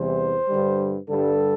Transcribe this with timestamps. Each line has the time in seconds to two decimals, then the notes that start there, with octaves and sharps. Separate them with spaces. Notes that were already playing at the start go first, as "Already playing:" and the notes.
Already playing: E2 C3 E3 G3 C5
0.49 G2 D3 G3
1.09 G2 D3 G3 A4